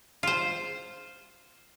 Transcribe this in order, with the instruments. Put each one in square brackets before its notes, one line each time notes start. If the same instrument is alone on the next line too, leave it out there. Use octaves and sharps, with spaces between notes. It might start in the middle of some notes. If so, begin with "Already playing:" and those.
[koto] F4 C5